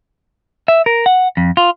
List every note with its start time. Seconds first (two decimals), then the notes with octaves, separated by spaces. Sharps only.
0.68 E5
0.86 A#4
1.06 F#5
1.37 F2
1.57 F4